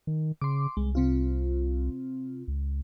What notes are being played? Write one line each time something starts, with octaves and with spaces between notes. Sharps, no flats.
D#3
C#3 C6 D6
C2 G#3
C3 C4 F4
C#2